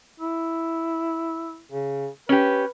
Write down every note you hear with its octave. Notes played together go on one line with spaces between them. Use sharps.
E4
C#3
C#4 G4 B4